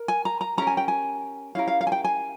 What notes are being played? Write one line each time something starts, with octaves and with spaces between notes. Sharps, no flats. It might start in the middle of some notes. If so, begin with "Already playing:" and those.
Already playing: A#4
G#5
A#5
A#5
C#4 G4 A#4 A#5
G#5
G5
G#5
C#4 E4 G4 A#4 F5
F5
F5
G#5
G5
G#5